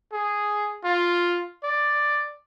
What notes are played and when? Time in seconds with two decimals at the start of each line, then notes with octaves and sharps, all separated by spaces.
0.13 G#4
0.84 F4
1.64 D5